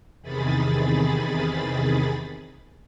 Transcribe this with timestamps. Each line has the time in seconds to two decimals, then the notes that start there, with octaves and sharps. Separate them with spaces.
0.22 E2 C3 D#3 G#4 B5 A6